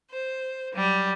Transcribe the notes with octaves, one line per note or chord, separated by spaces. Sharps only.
C5
F#3 G3